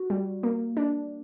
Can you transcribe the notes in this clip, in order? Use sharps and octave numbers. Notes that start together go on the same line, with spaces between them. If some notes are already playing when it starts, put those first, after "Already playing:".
Already playing: F#4
G3
A#3
D4